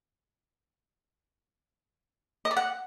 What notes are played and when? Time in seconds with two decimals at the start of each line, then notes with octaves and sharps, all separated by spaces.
2.45 D#5
2.51 D5
2.57 F#5